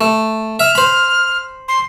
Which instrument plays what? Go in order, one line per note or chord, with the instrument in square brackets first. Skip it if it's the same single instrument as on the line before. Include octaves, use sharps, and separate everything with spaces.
[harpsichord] A3
[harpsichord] E5 [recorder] F6
[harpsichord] C5 B5
[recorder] C6